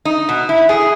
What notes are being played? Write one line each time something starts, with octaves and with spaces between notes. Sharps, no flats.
D#4
B2
E4
G#4